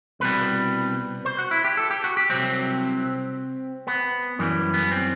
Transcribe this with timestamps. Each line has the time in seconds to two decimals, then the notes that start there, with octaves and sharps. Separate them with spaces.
0.20 C2 B2 G3 B4
1.25 C5
1.38 F#4
1.51 E4
1.64 G4
1.77 A4
1.91 G4
2.04 F#4
2.17 G4
2.29 C2 C3 F#3 C4
3.87 B3
4.39 F#2 E3 G3
4.74 B3
4.91 C4